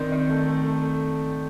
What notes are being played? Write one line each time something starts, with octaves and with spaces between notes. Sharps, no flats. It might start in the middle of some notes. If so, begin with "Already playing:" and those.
Already playing: D#3 C4 D5
D#3
A3
A3
A3